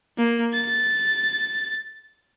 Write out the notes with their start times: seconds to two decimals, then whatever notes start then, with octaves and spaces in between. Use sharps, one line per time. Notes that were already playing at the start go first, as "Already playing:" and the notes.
0.18 A#3
0.54 A6